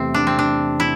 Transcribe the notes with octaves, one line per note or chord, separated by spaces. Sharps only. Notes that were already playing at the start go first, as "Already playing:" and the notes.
Already playing: E2 C3 E3 A3 C4
D4
C4
D4
E4